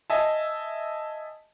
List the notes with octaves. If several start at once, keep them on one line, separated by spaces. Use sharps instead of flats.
D#5 E5 G#5 A5